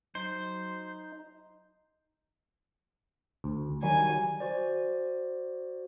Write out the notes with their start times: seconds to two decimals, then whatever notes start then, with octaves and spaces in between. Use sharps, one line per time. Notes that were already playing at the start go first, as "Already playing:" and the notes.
0.15 F#3 D#4 C5
3.44 D2
3.83 D#3 F#3 G3 G#5
4.40 F#4 C5 D5